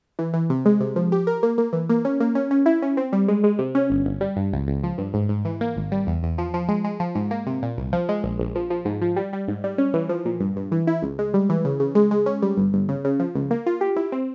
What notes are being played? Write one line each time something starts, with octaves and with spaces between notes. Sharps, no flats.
E3
E3
C3
G#3
C3
F3
G4
A#4
A#3
A#3
E3
A#3
C#4
A#3
C#4
C#4
E4
C#4
C4
G3
G#3
G#3
C3
C#4
G1
G1
G3
G2
C#2
C#2
F3
G2
G#2
G#2
E3
A#3
G#1
G3
E2
E2
F3
F3
G#3
G#3
F3
G#2
A#3
C3
A#2
C2
F3
G#3
A#1
A#1
F3
F3
G#2
F3
G3
G3
G#2
G3
C#4
E3
F3
A#2
G2
G2
E3
E4
C#2
G#3
G3
E3
C#3
C#3
G#3
G#3
C#4
G3
G1
G1
C#3
C#3
F3
C#2
A#3
F4
G4
E4
C4